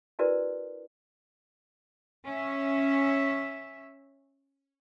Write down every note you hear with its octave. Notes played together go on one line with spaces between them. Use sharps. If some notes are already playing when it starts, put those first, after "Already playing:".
D4 E4 F#4 A#4 B4 D5
C#4 E5